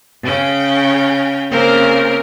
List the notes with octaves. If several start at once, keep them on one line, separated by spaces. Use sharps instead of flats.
C#3 C#4 G5
C#3 A#3 C4 A#4 C5